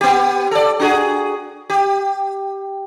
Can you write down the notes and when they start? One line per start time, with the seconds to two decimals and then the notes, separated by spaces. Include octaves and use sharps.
0.01 B3 G4
0.51 A4 D5
0.80 D4 F#4 G#4
1.70 G4